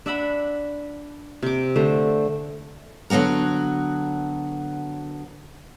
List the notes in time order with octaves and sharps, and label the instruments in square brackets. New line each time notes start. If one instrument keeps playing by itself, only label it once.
[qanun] D4 E5 F#5 B5
C3 D6
D3 A3 C5
[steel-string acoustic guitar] D3 F#3 B3 F#4 A#4